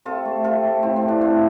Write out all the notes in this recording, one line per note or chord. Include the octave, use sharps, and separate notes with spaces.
C3 F4 A4
A3
C3 F4 A4
A3
A2 C4
C4
A2
D4
A3 C4 F4